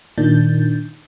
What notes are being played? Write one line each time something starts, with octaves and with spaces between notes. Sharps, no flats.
A#2 D#3 D4 G6 A6